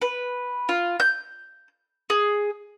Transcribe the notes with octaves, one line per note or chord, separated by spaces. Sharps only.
B4
F4
G6
G#4